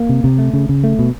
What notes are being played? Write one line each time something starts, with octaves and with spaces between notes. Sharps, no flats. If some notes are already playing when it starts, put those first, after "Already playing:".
Already playing: A#3
C3
C3
A3
C#3
C#3
A3
B2